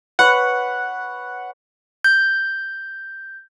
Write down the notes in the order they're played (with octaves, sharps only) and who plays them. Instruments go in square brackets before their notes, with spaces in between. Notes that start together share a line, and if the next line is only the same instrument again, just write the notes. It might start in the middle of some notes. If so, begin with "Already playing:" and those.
[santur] B4 C#5 [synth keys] F#5
[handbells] G6